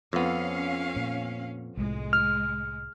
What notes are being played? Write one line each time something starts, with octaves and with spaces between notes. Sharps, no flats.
F2 B3 C#4 F5
A#2
C2 A2 G#3
F6